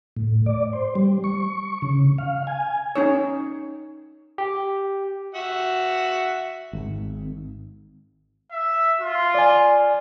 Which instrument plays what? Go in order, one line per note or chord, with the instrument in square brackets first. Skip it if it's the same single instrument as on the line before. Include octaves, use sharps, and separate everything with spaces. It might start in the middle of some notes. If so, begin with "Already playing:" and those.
[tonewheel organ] A2
D5
C5
G3
C#6
C#3
F5
G#5
[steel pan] C#4 D#4 C#5
[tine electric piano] G4
[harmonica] F#4 E5 F#5
[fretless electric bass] G#1
[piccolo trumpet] E5
F4
[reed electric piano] D5 G#5